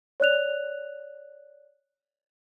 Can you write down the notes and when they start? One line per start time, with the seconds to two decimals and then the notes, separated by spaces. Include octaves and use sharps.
0.20 C#5 D5 F#6 F7